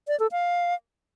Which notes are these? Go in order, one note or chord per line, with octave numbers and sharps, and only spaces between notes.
D5
A4
F5